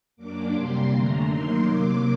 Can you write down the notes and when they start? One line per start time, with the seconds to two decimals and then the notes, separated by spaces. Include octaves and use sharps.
0.16 F#2 F#3 A#3 D4 D6
0.52 C3 G3 A#3 C6
0.87 F#2 D3 A3 A#5
1.24 D#3 F#3 A#3 D#4 C6
1.59 C3 F#3 A#3 D6